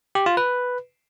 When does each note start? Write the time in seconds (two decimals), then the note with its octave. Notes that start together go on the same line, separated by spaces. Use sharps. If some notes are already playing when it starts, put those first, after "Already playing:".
0.15 G4
0.26 F4
0.37 B4